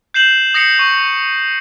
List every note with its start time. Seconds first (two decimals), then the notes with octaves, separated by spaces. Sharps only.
0.14 G6 C7 E7 F#7
0.54 D#6 A#6 C7 C#7
0.79 C#6